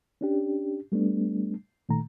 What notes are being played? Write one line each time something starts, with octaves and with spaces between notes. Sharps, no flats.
C#4 D4 G4
G3 A3 B3 D4
A#2 D#3 A3 A#5